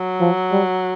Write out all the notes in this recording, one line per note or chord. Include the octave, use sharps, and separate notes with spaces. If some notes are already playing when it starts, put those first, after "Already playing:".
Already playing: F#3
F3
G3